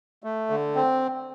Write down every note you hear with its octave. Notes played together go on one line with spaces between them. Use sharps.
A3
D3
C4